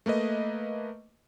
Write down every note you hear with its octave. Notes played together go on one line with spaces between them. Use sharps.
A3 A#3 B4 D#5